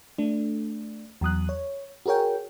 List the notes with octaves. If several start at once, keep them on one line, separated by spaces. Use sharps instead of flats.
A3 D4
E2 F#3 D#6 F#6
C#5
F#4 G#4 A#4 C#5 G5